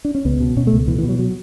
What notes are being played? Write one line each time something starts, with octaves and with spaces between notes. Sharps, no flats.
D4
C#4
C#2 B3
B2
B2 C#4
A3
C#2
B2 E3
E3
B2
F#3
F#3